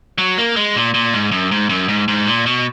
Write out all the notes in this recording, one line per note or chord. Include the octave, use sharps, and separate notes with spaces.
F#3
A#3
G#3
A#2
A#2
G#2
F#2
G#2
F#2
G#2
G#2
A#2
B2